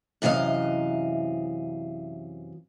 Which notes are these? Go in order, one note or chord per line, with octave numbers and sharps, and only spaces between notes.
F#2 C3 E3 D#5 F5